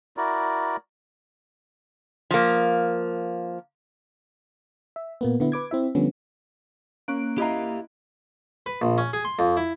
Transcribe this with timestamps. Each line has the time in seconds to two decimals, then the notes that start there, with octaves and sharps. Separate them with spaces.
0.17 E4 F#4 A#4 D5
2.31 F3 A#3
4.96 E5
5.21 A#2 A#3 B3
5.40 D3 B3 E4
5.52 B4 D6 G#6
5.71 C4 E4 E5
5.95 D3 F3 G3 B3 C#4
7.08 A#3 C#4 F#6 D7
7.38 E4 G4 D#5 F5 A#5
8.66 B4
8.82 A#1
8.98 C#4
9.13 G#4
9.25 C6
9.39 F2
9.57 E4